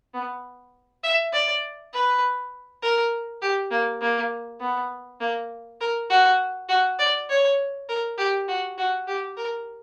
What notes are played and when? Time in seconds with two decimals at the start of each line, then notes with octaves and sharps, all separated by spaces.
0.14 B3
1.03 E5
1.33 D5
1.93 B4
2.82 A#4
3.42 G4
3.71 A#3
4.02 A#3
4.60 B3
5.20 A#3
5.81 A#4
6.10 F#4
6.69 F#4
6.99 D5
7.29 C#5
7.89 A#4
8.18 G4
8.48 F#4
8.78 F#4
9.07 G4
9.37 A#4